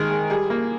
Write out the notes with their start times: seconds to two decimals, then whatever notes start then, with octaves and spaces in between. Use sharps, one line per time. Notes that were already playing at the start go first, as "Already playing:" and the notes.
Already playing: D#3 G#3 G#4 A#4
0.11 G#3
0.30 G3 G#4
0.50 A#3